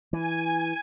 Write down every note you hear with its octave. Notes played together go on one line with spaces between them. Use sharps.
E3 G#5